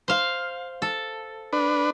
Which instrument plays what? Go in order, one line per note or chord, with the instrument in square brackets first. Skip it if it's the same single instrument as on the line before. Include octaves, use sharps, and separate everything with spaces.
[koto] C5 F5
A4
[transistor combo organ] D4 B4